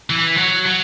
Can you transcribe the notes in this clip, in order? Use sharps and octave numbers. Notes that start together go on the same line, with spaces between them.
E3
F#3
F#3